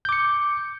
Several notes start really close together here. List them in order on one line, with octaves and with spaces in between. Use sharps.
G6 D6 C#7